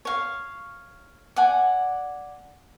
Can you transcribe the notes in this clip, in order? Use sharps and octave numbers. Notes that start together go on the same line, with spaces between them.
C#5 F5
D5 F#5 G#5